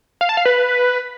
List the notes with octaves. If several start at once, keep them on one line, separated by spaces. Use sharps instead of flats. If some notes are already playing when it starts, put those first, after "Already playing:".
F5
A5
F5
B4